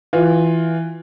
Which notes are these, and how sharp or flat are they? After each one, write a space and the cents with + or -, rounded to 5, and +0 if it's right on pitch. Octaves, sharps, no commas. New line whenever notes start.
E3 +0 F4 +10